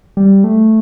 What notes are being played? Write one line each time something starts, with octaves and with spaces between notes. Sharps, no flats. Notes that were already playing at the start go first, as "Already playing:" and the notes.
G3
A3